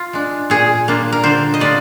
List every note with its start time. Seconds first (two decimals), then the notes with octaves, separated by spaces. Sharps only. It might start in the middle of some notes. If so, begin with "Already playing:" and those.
Already playing: F4
0.13 G#3 D4
0.50 A#2 G#4
0.88 G3 A#3 D4 F4
1.12 A#4
1.24 D3 C5
1.54 D#5
1.60 G3 D4 F4 D5